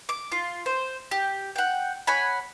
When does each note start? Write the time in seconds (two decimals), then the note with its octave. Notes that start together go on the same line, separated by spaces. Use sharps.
0.09 D6
0.32 F4
0.66 C5
1.11 G4
1.56 F#5 G5
2.07 C#5 F#5 G#5 B5